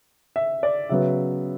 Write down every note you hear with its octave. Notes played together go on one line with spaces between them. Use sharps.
E5
D5
C#3 F#3 B3 E5